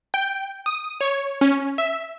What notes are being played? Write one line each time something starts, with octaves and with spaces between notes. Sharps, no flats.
G5
D#6
C#5
C#4
E5